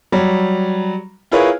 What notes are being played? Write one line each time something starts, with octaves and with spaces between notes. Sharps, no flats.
F#3 G3
E4 F4 G#4 A#4 B4 C#5